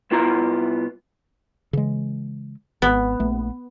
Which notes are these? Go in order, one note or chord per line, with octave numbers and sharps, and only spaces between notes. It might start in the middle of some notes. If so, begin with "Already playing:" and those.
C2 B3 E4 F4 A#5
C#3 E3 G#3
G#1 B3
A#1 A3